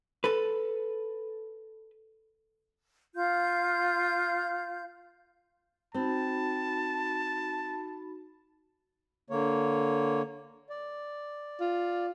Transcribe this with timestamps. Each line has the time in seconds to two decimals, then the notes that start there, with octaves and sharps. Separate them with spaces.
0.24 A4 B4
3.15 F4 F5 G6
5.94 C4 D#4 F#4 A5 B5
9.30 D3 A#3 C#5
10.70 D5
11.61 F4